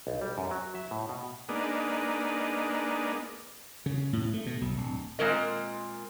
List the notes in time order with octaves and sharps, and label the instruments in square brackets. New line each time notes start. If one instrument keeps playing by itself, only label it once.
[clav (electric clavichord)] B1
G3
F#2
F#3
E5
A2
B2
[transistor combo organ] G#3 A#3 B3 D4 D#4
[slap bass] C#3
A2
A3
B2
B1
D1
[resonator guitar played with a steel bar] A#2 G#3 C4 A#4 D#5